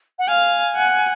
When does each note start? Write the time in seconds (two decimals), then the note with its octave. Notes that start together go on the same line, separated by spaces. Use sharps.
0.19 F#5
0.28 F5 G#5
0.75 F#5